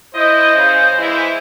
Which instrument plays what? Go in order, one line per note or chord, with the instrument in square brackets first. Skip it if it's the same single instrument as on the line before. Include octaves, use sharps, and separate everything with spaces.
[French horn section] E4 D#5 [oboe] C5
[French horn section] C#3
E3 G#3 E4